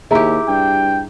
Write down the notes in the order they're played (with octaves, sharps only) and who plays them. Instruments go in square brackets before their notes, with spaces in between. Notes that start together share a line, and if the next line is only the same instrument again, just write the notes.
[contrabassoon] D#2 [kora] E4 G4 [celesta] G#4 A#5
[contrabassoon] G2 [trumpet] G5